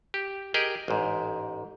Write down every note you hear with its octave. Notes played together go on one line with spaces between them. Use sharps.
G4
G4 G#4 A#4 D#5
A1 G#2